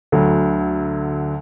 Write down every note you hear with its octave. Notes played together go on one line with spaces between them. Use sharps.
D2 D3 F#3